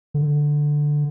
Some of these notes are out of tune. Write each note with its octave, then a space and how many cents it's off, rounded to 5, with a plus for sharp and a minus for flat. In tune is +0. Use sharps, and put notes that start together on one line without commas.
D3 +5